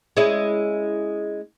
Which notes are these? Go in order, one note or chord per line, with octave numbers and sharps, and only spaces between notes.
G#3 C#4 E4